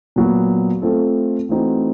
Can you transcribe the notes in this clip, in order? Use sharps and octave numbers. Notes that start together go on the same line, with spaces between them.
A#2 F#3 B3
A3 C4 F4 A4
E3 A3 C4 D#4 F#4